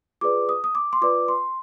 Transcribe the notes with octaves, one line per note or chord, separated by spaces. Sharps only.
F4 G#4 B4 D5 D6
D#6
D#6
D6
C6
F4 B4 D5 D6
C6